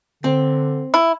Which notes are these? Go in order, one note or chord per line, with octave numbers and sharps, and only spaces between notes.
D3 C4
E4